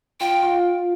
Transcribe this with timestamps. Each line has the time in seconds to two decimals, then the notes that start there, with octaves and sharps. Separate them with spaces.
0.20 F4 G5
0.42 F4